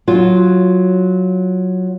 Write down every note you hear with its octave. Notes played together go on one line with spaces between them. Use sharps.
F#3 F4